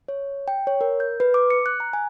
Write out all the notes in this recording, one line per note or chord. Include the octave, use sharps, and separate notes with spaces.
C#5
G5
C#5
A#4
G6
B4
D6
C#7
F#6
A#5
G#5